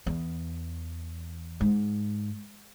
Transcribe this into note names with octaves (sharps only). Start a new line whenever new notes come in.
E2
G#2